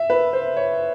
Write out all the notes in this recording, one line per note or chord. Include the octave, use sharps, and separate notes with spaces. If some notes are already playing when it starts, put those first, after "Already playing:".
Already playing: E5
B4
C5
C#5